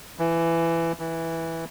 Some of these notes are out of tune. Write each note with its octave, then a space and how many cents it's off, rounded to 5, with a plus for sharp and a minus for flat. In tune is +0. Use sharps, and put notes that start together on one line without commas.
E3 +15
E3 -5